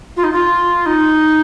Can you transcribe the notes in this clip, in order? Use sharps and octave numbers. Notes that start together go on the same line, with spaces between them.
F4
D#4
F4
D#4